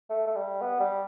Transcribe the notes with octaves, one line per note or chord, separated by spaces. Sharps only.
A3
A3
G3
B3
G3